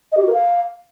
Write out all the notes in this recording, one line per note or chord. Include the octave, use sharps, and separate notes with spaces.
D#5
G4
F#4
A#4
F5